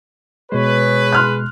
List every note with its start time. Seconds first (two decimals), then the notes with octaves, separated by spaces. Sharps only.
0.52 B2 G#3 G#4 B4 C#5
1.12 C6 F6 F#6